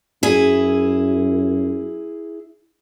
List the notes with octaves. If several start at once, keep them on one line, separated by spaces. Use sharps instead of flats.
F#2 E4 G#4